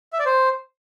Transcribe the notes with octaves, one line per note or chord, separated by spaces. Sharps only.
E5
D5
C5